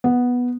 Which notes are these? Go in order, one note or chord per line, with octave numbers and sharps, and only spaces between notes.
B3